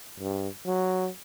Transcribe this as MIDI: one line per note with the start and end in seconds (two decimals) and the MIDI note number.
0.20 0.49 43
0.66 1.09 54